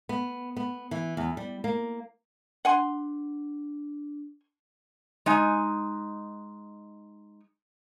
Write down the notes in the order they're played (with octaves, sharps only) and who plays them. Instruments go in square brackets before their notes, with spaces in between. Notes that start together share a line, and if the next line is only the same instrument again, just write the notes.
[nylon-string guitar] B3
B3
E3
E2
G3
A#3
[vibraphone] D4 [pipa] F#5 G#5 C6
[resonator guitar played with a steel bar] G#3 D#4 G#5